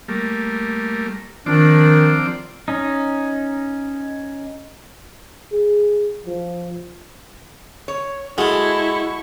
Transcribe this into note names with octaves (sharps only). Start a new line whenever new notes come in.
G3 A3 A#3
D#3 F3 C4 D4 D5
C#4 D#4
G#4
F3
C#5
G#3 E4 F#4 A4 C#6